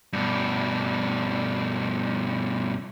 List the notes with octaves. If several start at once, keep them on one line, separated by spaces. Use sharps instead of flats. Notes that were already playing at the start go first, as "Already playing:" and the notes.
G2 B2